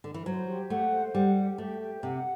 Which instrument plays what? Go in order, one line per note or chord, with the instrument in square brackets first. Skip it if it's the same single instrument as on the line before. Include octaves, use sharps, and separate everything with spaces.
[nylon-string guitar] D3
E3
[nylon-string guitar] F#3 [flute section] C5
[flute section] G4
[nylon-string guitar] A3 [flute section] F#5
[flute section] C5
[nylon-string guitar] G3 [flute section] F#5
[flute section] G4
[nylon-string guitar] A3 [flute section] G4
[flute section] G4
[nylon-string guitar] C3 [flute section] F#5